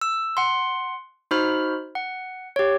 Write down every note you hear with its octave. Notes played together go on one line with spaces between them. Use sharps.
E6
F#5 C6
D#4 F#4 C5 B5 F6
F#5
G4 C#5